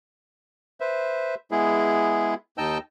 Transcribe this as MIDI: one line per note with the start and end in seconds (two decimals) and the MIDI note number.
0.80 1.35 71
0.80 1.35 72
0.80 1.35 76
1.51 2.34 56
1.51 2.34 59
1.51 2.34 64
1.51 2.34 68
2.58 2.78 39
2.58 2.78 63
2.58 2.78 75
2.58 2.78 79
2.58 2.78 81
2.58 2.78 88